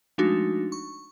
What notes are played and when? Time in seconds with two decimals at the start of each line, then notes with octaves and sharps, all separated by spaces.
0.18 F3 G#3 A3 D4 D#4 F#4
0.72 C#6